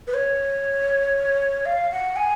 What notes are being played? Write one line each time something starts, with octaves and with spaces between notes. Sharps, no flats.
B4
C#5
F5
F#5
G#5